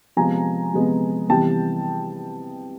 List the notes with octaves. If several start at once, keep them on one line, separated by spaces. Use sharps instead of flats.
C3 F3 G#3 B3 G#5 A#5
C3 F3 G#3 B3
C3 E3 G3 B3 G5 A5